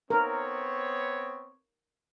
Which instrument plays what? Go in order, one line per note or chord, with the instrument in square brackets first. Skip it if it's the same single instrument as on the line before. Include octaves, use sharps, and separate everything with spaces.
[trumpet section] B3 C4 C#5 [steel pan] A#4